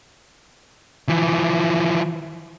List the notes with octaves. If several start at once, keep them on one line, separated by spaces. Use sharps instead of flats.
E3 F3